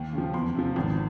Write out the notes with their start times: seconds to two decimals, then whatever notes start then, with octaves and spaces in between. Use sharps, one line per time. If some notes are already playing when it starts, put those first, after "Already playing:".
Already playing: D#2
0.13 C#3 F3
0.34 E2 C6
0.55 C3 F3
0.76 G#1